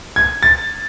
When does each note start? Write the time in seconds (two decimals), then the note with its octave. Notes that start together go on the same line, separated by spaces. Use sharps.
0.16 G#6
0.43 A6